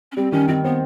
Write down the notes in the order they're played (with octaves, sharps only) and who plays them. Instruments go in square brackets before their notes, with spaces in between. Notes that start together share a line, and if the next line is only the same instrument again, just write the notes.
[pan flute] C#4
[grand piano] G3 [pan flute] C4
[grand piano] D#3 [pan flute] C#4
[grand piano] D#3 [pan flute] C4
[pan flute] B3 [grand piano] C4